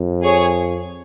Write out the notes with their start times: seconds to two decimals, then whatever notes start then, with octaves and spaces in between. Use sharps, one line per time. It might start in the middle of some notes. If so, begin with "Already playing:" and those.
Already playing: F2
0.22 G#4 C#5